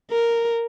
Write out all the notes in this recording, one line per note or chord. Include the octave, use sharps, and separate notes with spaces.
A#4